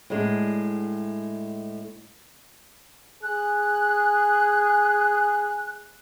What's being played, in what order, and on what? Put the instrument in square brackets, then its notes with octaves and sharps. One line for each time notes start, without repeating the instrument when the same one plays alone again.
[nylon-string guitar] A2 G#3 D4
[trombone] G#4 [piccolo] F#6